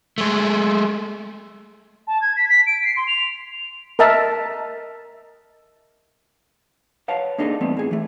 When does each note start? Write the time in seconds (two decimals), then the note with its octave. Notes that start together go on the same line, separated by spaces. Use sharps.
0.18 G#3 A3
2.07 A5
2.21 G#6
2.36 B6
2.49 B6
2.66 D7
2.85 C7
2.97 C6
3.08 F7
3.99 A#4 D#5 E5 A5
7.08 B4 C#5 F5 F#5 A5
7.38 A#3 D4 D#4 G#4 A4
7.61 E2 G2 A3 B3 C4
7.77 A2 G#4
7.91 E3 A3